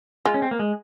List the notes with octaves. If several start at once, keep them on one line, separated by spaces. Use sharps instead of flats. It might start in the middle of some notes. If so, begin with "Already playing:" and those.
G#3 F4
C#4
C4
A#3
G#3